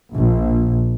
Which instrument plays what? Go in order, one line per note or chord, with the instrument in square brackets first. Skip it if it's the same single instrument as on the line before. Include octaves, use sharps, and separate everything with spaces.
[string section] A#1